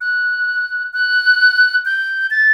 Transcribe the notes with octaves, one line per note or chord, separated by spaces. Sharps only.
F#6
F#6
G6
A6